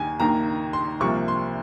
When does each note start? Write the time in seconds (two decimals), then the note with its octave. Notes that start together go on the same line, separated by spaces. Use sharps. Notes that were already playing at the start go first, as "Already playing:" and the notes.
Already playing: D#2 D#3 A#3 G#5
0.20 D#2 D#3 A#3 A#5
0.73 C6
1.00 C2 C3 F3 A#3 C#6
1.28 C6